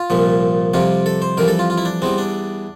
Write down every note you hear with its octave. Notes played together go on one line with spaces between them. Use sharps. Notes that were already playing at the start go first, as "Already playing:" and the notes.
Already playing: F4
C2 A#2 F3
F2 C3 G3 F4
A4
C5
F2 E3 G3 A#4
A4
F4
F4
E4
D4
E2 E3 G3 C4
D4